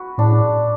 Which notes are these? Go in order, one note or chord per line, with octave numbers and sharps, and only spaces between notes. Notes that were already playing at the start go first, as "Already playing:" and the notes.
Already playing: F#4 B4
A2 D4